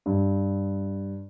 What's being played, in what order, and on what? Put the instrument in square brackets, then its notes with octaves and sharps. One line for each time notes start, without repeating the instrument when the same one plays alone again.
[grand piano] G2